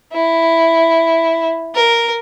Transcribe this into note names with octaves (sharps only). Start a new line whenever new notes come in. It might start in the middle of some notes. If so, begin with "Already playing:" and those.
E4
A#4